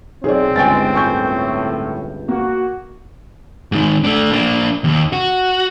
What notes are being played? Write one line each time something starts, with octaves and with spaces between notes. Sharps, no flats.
B1 C4 G#4 C#5 D5
G1 C#2 G#2 G#3 C#5 G5 G#5 A6
A2 G#5 C#6 G6
A#3 F#4
G#2 D#3
A3 D4
A#3 D4
D#2
F#4